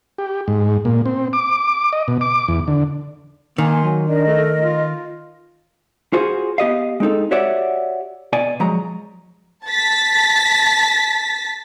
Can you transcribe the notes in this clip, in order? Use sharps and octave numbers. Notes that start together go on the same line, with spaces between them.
G4
G#2
A#2
C4
D6
D#5
B2
D6
E2
D3
D#3 A#3 G#5 C6
F#3
D4 A#4 D#5
A3
F4
F4 F#4 G#4 C5
B3 G4 D#5 F5
G#3 C4 D#4 A4
F#4 G4 C#5 D5 E5 F#5
B2 D5 G#5
F3 F#3 G#3 A#5
A5 A6 B6